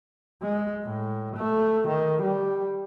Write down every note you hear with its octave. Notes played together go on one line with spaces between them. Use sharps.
G#3
A2
A3
D#3
G3